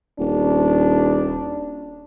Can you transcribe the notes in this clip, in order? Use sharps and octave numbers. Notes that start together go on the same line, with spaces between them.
D#1 D4